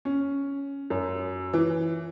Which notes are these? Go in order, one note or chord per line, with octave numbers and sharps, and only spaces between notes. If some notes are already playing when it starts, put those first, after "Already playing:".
C#4
F#2
E3